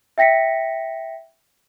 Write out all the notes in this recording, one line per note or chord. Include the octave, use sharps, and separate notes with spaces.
E5 G5 A#6 B6 C#7